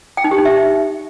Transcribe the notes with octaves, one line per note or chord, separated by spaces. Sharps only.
G5
D#4
G4
D#4
E5